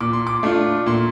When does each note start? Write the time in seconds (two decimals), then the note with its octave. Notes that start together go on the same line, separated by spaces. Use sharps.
0.01 A#2 D6
0.13 C6
0.27 D6
0.43 A3 D4 F4
0.86 A#2 C6